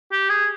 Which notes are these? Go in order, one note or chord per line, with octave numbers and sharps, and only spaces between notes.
G4
G#4